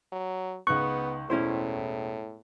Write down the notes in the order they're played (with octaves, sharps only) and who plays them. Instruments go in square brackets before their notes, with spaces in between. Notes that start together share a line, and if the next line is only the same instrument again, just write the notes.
[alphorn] F#3
[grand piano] C#2 D#4 F#6 [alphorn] B3 [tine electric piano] C#6
[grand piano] E1 [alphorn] A2 [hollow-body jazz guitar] C#4 E4 C5